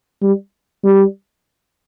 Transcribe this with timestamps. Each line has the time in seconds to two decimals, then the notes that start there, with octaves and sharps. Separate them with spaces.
0.22 G3
0.84 G3